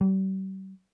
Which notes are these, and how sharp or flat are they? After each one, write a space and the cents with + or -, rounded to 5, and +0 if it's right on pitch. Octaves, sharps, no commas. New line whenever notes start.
G3 -40